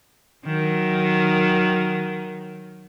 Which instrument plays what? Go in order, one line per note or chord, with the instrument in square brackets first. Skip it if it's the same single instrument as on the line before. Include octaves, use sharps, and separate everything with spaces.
[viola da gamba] D#3 F#3